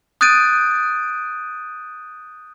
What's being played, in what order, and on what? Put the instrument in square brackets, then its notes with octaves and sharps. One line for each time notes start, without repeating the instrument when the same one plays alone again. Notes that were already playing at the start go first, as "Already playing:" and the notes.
[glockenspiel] D#6 F#6 G6 A6 D7 D#7